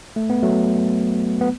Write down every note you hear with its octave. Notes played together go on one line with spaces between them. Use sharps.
A3
B3
F#3 A3
B3